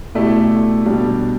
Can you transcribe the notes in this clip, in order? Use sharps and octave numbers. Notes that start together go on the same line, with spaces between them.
B2 A3 E4 G4 D5
B2 G3 D4